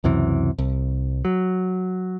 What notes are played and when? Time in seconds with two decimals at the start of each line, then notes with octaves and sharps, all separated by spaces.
0.04 C#2 F#2 C3 E3
0.58 C2
1.25 F#3